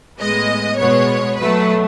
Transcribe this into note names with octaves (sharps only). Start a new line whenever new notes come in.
A2 G#3 B3 D#5
B2 G#3 B3 C#5
B2 F#3 A3 B4